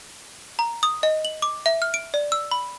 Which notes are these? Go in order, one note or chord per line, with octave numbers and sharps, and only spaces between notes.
A#5
D#6
D#5
F#7
D6
E5
F6
D7
D5
E6
B5